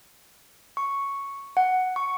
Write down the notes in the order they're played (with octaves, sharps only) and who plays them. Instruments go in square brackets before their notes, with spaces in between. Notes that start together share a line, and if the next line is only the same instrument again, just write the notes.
[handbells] C#6
F#5
C#6